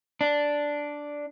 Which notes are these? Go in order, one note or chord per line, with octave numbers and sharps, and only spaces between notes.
D4